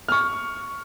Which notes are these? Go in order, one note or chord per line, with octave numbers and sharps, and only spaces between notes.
C#6 F6